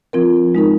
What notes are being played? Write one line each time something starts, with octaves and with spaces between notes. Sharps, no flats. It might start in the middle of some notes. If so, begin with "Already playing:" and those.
F3 C4 F4 A#4
G#3 D#4 A#4